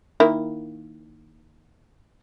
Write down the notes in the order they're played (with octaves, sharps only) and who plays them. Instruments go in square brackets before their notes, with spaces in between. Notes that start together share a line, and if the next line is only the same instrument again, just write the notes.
[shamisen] D#3 A#3 E4